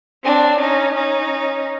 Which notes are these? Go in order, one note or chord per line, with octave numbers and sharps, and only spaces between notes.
C4 D4
C#4 D#4
C#4 D#4